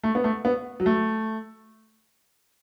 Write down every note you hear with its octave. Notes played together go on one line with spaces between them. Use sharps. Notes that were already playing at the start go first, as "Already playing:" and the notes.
A3
B3
A3
B3
F#3
A3